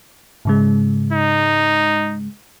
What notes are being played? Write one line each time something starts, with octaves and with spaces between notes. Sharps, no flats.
G#2 C#3 G#3
D#4